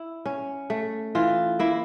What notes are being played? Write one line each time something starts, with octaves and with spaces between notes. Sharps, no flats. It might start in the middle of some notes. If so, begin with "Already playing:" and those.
Already playing: E4
C#4
A3
E3 F4
A#3 E4